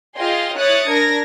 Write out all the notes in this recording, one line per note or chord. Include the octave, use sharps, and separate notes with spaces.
F4 G#4 D#5 F5 G5 C6
E4 C#5 D#6 F#6 A6 C#7
D4 A#4 G#6 A#6